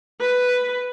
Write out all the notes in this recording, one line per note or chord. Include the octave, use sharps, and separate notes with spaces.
B4